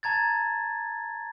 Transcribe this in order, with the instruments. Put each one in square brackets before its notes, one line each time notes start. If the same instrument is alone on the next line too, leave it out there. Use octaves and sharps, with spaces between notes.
[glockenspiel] A5 A#5 G#6 A6